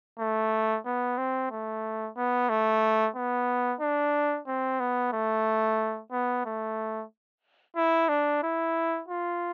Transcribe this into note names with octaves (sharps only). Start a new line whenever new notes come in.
A3
B3
C4
A3
B3
A3
B3
D4
C4
B3
A3
B3
A3
E4
D4
E4
F4